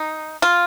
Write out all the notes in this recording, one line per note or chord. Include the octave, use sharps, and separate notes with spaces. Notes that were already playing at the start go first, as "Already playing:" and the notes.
Already playing: D#4
F4